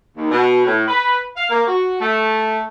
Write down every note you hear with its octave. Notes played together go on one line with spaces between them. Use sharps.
D#2
B2
A2
B4
F5
A#3
F#4
A3